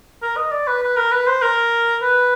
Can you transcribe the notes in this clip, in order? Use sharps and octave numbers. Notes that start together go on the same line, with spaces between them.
A#4
D#5
D5
B4
B4
A#4
B4
C5
A#4
B4